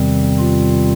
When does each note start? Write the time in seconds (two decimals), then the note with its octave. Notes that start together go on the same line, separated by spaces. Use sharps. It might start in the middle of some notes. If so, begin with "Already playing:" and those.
Already playing: E2 C3 D#3 G3 C4
0.39 F4